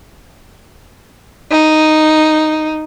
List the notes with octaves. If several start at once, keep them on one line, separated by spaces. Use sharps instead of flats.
D#4